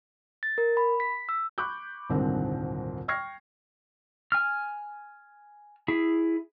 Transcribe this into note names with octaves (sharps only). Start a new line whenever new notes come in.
A6
A#4
B5
B6
E6
B5 C#6 D6 F#6 G6
D#1 C2 G#2 D3 C4 A#4
G5 C#6 F6 G#6 A#6 C7
G#5 F6
E4 G#4